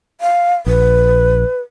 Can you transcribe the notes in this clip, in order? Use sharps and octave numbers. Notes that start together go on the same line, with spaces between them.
F5
A#1 B4